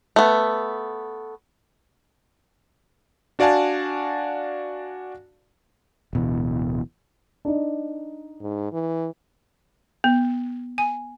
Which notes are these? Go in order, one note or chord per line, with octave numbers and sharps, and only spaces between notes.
A3 B3
D4 F#4 D5 F5 G#5 A5
D1 B2 E3
D4 D#4
G#2
E3
B3
G#5